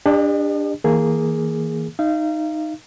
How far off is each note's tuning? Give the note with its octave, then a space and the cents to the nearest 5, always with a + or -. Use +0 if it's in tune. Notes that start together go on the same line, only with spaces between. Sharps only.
D4 +0 G4 +40 D#5 -45
E3 -35 A#3 -5 G#4 +0
D#4 -5 F5 -35